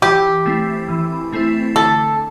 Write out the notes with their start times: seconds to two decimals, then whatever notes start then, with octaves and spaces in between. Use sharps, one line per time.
0.02 E3 G4
0.46 A3 C4 E4
0.88 E3
1.32 A3 C4 E4
1.76 D3 A4